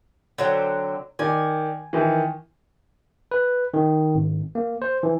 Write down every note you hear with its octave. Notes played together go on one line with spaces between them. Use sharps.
D3 F#3 C4
D#3 D5 G#5
D#3 E3
B4
D#3
G#1
A#3
C5
E3